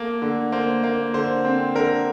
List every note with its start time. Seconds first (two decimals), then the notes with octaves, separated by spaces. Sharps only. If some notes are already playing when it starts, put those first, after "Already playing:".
Already playing: A3 A#3
0.22 D3
0.52 A#3 C5
0.84 A#3
1.14 D3 C5
1.45 C4
1.75 D3 A#4